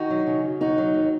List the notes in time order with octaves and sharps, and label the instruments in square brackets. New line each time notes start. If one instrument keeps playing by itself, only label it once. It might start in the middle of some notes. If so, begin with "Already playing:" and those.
Already playing: [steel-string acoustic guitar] D#3 D#4 F#4
F#3
C#3
F#2
D#2 D#4 F#4
F#3
D#2